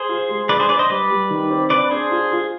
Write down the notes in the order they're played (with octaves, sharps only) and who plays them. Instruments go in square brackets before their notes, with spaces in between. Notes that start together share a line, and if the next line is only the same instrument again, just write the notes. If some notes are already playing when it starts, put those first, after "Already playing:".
Already playing: [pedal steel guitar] G#4 C5
[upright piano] F4
G#3
[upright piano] D4 [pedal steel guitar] B4 D5
[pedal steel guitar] G#4 C5
[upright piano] D4 [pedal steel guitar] B4 D5
[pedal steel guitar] C5 D#5
[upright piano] G3 [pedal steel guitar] B4 D5
[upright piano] G3
D#3
C4
[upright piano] D4 [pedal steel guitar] B4 D5
[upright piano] D4 [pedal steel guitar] G#4 C5
[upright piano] F4
F4